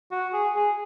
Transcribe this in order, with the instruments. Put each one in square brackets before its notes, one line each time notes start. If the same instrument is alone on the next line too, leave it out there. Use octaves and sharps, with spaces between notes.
[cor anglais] F#4
G#4
G#4